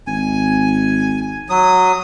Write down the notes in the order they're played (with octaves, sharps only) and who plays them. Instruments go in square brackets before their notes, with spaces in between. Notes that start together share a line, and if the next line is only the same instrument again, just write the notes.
[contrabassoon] G#1 [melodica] G#5
[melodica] F#3 D#6